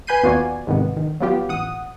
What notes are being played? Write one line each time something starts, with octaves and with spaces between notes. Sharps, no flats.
B4 G#5 B5 G6 C7 D#7
D#2 B3 F4 F#4 D5 G#5
G#2 C3 D#3 B3
D#3
F#3 G3 B3 F4 G4
A1 F#5 D#6